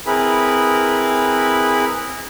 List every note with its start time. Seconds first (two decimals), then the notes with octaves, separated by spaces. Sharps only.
0.06 C4 E4 G#4 A#4 B4 B5